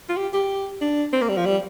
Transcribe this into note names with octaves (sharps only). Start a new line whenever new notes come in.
F4
G4
G4
D4
C4
A#3
G3
F3
G3